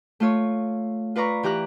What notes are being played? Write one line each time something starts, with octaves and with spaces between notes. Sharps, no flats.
A3 F4 C#5
F4 B4 D5 A#5 C#6
E3 G4 A#5 F#6